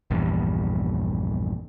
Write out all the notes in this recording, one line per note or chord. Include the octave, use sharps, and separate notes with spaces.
A#1 E2 G2